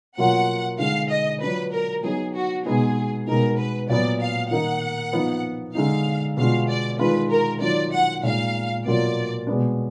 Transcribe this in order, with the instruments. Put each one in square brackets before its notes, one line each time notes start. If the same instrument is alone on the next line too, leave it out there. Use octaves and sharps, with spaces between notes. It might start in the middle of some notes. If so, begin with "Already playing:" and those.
[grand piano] B2 F#3 A#3 F4 [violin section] F#5
[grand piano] D3 G#3 D#4 [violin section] F5
[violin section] D#5
[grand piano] F#3 D4 F4 [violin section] B4
[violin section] A#4
[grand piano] F#3 B3 D#4 [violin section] G#4
[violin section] F#4
[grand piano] B2 G#3 B3 D#4 [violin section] G#4
[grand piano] B2 G#3 D#4 [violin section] A#4
[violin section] B4
[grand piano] A#2 F#3 B3 [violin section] D5
[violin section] F5
[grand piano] D#3 A#3 D#4 [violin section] F#5
[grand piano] F3 B3 D#4
[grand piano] D3 G#3 D#4 [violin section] F5
[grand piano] B2 G#3 D4 F4 [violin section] F5
[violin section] D5
[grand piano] D#3 G#3 D4 F4 [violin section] B4
[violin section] A#4
[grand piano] D#3 F#3 D4 F4 [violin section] D5
[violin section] F#5
[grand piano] A#2 G#3 D#4 [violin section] F5
[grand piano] B2 F#3 A#3 D4 F4 [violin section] D5
[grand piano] B2 G#3 B3 D4